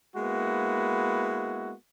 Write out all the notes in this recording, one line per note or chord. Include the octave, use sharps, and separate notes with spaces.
G#3 A#3 B3 E4 F#4